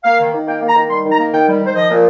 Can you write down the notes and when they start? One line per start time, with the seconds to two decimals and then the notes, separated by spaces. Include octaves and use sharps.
0.04 A#3 F5
0.19 D#3
0.34 D#3
0.47 A#3 G5
0.61 A#3
0.68 A#5
0.76 D#3
0.89 G3 C6
1.04 D#3
1.12 A#5
1.18 A#3
1.33 D#3 G5
1.47 G3
1.61 D#3
1.66 C5
1.75 F3 D#5
1.90 A#2